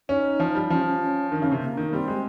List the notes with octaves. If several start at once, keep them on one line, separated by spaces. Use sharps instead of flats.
C#4 D#4
F3
G3
F3 C#4
C#4
C#4
D#3
C#3 C#4
C3
A#3
D#3
G3 C4
G#3